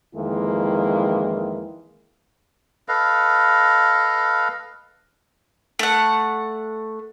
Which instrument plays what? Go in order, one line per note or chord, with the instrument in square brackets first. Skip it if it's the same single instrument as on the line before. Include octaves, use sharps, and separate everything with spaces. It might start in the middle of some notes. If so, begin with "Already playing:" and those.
[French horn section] F2 D#3 E3 G#3 A#3 E4
[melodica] A4 B4 D#5 F5
[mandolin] A3 F#5